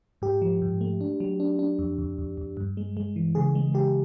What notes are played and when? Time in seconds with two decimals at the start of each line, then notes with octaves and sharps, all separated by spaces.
0.22 G#2 G4
0.42 F3
0.62 G#2
0.81 A3
1.01 D4
1.20 F#3
1.40 D4
1.59 D4
1.79 F2
1.98 F2
2.18 F2
2.38 F2
2.57 G2
2.77 G#3
2.97 G#3
3.16 E3
3.35 C#3 G#4
3.55 G#3
3.74 C#3 G4